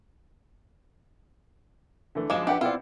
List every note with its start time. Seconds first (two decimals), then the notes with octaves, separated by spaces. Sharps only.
2.15 D3 E3 A3
2.30 A#1 F#2 F3 G#3 D6 E7
2.47 D4 G4 B4 E5 F#5 G5
2.61 B2 C4 E4 F4 D5